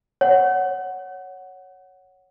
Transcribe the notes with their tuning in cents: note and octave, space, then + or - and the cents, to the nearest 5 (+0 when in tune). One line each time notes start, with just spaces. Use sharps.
C#5 +0 F#5 +0